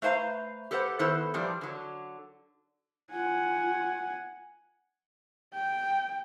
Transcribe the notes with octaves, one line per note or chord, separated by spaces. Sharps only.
A3 B4 C5 F5 A#5
G4 A4 B4 C5 F#5
D#3 B3 E4 A4 B4 C5
A#2 E3 F3 G3 D4
D3 F#3
F4 F#5 G#5
G5